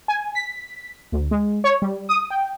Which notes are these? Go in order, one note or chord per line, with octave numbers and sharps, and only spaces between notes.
G#5
B6
D2
G#3
C#5
G3
D#6
G5